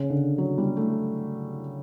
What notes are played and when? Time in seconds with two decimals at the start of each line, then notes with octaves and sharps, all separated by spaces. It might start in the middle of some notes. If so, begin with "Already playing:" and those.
Already playing: C#3
0.10 D3
0.38 F#3
0.58 G3
0.77 A3